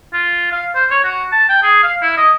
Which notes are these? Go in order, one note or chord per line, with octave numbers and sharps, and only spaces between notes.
F4
F5
C5
C#5
F#4
A5
G5
G#4
F5
E4
D#5